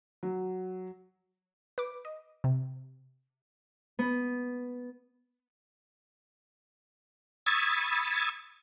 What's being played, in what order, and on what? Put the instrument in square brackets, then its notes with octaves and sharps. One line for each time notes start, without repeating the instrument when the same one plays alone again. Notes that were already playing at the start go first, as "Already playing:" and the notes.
[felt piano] F#3
[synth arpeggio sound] B4 D6
D#5
C3
[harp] B3
[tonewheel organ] B5 C#6 D#6 E6 G#6 A6